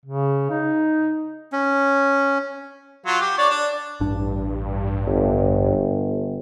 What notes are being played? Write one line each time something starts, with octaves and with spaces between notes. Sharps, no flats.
C#3
D#4
C#4
F#3 F4
G4
D4 C#5 D5
D4
A1 G2 D4
G1